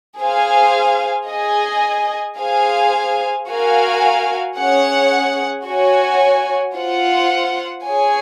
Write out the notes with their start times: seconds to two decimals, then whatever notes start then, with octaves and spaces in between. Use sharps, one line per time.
0.20 G#4 C5 F5 G#5
1.29 G#4 D#5 G#5
2.38 G#4 C5 F5 G#5
3.48 F#4 A#4 F5 G#5
4.58 C#4 G#4 C#5 F#5
5.67 F#4 C#5 G#5
6.76 F4 C5 F#5
7.85 G#4 C#5 G#5